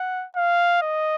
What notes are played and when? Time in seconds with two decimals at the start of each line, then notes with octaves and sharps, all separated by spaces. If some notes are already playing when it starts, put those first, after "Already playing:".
Already playing: F#5
0.36 F5
0.82 D#5